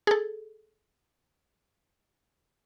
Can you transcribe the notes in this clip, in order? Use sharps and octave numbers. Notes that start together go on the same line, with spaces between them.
G#4 A4